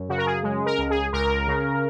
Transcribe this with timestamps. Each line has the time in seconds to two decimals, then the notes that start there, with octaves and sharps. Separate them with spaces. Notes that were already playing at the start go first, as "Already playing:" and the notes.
Already playing: F#2
0.09 C#3 F#4
0.18 A#4
0.26 G#4
0.43 G#3
0.66 A#4
0.78 C#2
0.90 G#4
1.13 C#2 A#4
1.48 C#3